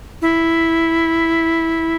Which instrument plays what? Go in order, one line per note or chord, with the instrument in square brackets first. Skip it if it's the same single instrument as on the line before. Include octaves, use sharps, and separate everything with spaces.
[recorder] E4